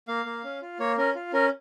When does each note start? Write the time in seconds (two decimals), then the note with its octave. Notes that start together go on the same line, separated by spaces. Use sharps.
0.08 A#3 F5
0.26 A#3
0.44 C#4
0.62 F4
0.79 A#3 C#5
0.98 C#4 A#4
1.15 F4
1.33 C#4 A#4